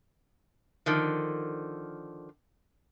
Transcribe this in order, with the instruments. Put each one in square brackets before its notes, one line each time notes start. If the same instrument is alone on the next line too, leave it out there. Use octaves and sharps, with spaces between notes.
[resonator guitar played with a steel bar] D3 D#3 F3